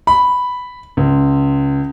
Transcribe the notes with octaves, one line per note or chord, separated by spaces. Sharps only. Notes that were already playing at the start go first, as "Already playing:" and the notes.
B5
C#2